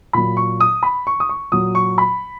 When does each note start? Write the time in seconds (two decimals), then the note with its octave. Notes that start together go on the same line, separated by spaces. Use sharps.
0.13 A#2 F#3 B5
0.37 C#6
0.60 D#6
0.83 B5
1.07 C#6
1.20 D#6
1.29 C#6
1.52 A#2 F#3 D#6
1.75 C#6
1.98 B5